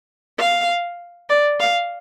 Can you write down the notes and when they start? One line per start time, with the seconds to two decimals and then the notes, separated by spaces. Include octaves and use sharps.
0.38 F5
1.29 D5
1.60 F5